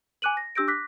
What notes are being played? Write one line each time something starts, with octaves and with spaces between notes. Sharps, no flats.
G#5 D6 F#6 D#7 F#7
A#6
D4 G4 E6 G6 A#6 D7
D6 F#6 A#6 B6